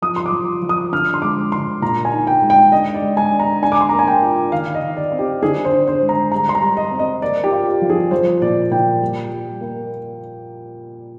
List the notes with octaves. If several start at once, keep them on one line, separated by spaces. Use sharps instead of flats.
F3 D#6
C6
D6
F3
F3
D#6
D3 F6
C6
G#3 D6
D3 C6
A#2 A#5
G#5
D#4
G5
G#3
G5
D4 D#5
D5
G#3
G#5
D4
A#5
D4 G#5
D6
C6
A#3 A#5
G#5
G5
F4
D#3 F5
D#5
D#3
D5
C4
G4
D3 G#4
C5
D4
C5
G#3
A#5
G3 A#5
C6
A#5
G3
D#5
C4
D#5
A#3 D5
G4
F4
F3
G#4
F3 C5
A#2 D5
A#2 G5
G3
G3
A#3